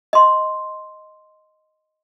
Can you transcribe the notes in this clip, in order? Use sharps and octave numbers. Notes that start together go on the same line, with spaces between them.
D#5 C6